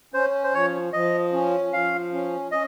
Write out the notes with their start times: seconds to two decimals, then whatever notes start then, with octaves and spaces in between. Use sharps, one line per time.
0.14 C#4 C5
0.43 C5
0.54 F3 C#5
0.93 F3 D#5
1.33 C#4
1.73 F3 F5
2.13 C#4
2.52 C#4 D#5